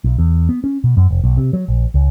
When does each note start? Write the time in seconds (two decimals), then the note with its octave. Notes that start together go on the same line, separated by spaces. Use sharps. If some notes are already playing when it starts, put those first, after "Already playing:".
0.04 B1
0.18 E2
0.49 B3
0.64 C#4
0.84 B2
0.97 F#2
1.11 F1
1.24 B1
1.37 C3
1.53 F#3
1.68 A#1
1.94 C#2